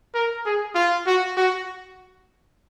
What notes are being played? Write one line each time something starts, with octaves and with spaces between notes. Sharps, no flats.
A#4
G#4
F4
F#4
F#4